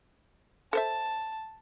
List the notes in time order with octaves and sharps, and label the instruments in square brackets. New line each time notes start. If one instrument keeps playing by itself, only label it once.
[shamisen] A4 C5 E5 [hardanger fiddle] A5